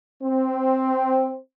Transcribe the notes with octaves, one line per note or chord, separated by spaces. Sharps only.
C4